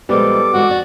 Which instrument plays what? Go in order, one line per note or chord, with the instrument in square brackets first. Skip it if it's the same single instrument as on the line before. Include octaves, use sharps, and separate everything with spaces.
[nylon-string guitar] A#2 F3 G#3 [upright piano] G3 B3 [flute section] A4 D6
[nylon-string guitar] E3 G#3 C4 [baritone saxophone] F#4
[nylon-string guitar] F2 D5